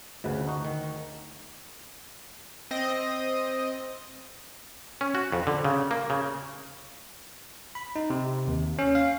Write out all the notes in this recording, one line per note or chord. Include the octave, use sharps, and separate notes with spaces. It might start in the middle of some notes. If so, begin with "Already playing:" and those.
D2 C#3 B4
D#4 F#4
D#3
C4 D#5
C#4
F#4
F2
D3
C#3
A#3
C#3
B5
D#4
C3
D#2
C#4
F5